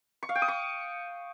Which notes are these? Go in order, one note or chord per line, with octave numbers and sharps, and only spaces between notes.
C#6
F5
G5
D#6
C#6